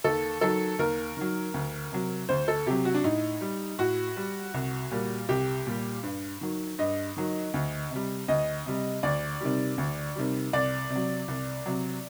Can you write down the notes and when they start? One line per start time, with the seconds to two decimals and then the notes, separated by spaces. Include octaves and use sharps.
0.04 D#2 A4
0.41 D#3 F#3 A4
0.79 D#2 A#4
1.17 D#3 F#3
1.54 D2
1.92 C3 F#3
2.29 D2 C5
2.48 A4
2.66 C3 F#3 G4
2.85 F#4
2.94 D4
3.04 A2 D#4
3.41 G3
3.78 A2 F#4
4.16 G3
4.54 C2
4.91 A#2 G3
5.29 C2 G4
5.67 A#2 G3
6.03 G2
6.41 D#3 F#3
6.79 G2 D#5
7.17 D#3 F#3
7.54 D2
7.91 C3 G3
8.28 D2 D#5
8.66 C3 G3
9.03 D2 D5
9.41 C3 D#3 G3
9.78 D2
10.16 C3 D#3 G3
10.53 C2 D5
10.90 C3
10.95 F#3
11.28 C2
11.66 C3 F#3